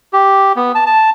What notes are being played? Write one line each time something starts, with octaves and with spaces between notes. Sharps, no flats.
G4
B3
A5
A5